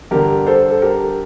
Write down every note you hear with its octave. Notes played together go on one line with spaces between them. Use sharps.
G2 D3 G4 A#4
A4 C5
A4
G4 A#4